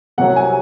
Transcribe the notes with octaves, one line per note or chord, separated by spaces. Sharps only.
C2 C3 F#3 F#5
G#5